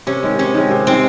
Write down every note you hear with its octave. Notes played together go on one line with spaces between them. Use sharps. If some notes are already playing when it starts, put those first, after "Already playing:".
C3 C#4
D#3 G#3
C3 C#4
D#3 G#3
C3
D#3 G#3 C4